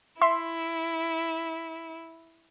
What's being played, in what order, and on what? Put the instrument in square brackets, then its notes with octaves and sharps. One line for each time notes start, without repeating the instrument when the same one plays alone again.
[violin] E4 [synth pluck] E5 C6